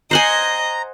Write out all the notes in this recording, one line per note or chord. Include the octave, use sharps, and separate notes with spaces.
C5 D#5 F#5 G#5 A#5